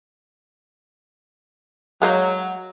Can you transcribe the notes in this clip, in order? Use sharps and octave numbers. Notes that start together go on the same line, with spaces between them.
F#3 G#3 A#3 D#4